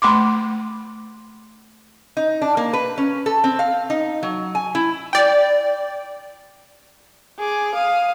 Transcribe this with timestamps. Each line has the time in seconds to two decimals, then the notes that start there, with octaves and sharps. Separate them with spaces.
0.02 A3 B5 C6 D6
2.17 D#4
2.42 D4
2.57 A#3
2.73 B4
2.98 C#4
3.26 A4
3.44 C4
3.59 F5
3.90 D#4
4.23 F#3
4.55 G#5
4.75 E4
5.13 D5 G5
7.38 G#4 D6
7.74 F5 D#6